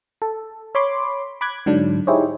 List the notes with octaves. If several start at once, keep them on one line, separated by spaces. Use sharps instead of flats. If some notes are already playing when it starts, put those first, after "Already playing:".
A4
C#5 B5 C6 D6
B5 D6 F#6 G#6
G#2 D3 F#3 D4
D#4 E4 G4 G#4 C5 C#5